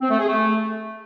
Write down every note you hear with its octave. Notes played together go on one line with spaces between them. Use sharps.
C4
A3
G#4
A3